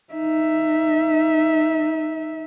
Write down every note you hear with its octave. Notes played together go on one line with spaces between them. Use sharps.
D#4 E5